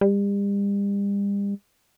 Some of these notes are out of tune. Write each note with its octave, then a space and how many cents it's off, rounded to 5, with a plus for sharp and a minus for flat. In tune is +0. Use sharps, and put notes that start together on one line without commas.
G3 +40